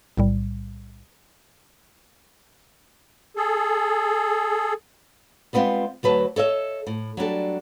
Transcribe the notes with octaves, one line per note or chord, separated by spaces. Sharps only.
B1 A2 G3
G#4 A4
G3 G#3 B3 C4 F4
D2 F#3 B4 A5
A4 C#5 D#5 E5
A2
F#3 G3 D4 A4